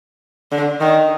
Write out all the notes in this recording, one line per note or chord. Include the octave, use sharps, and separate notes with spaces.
D3
D#3